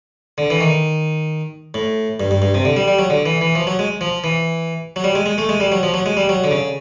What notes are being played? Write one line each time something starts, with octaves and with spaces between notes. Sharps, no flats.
D3
E3
D#3
A2
G2
G2
G2
C3
D3
G3
G3
F#3
D3
E3
E3
F3
F#3
G#3
F3
E3
F#3
G3
G#3
G#3
A3
G#3
G3
F#3
F3
F#3
G#3
G3
F#3
D3
C#3